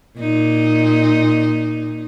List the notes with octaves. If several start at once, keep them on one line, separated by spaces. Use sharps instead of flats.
A#2 D#4